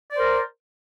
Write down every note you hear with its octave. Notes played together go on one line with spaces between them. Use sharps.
A#4 C5 D5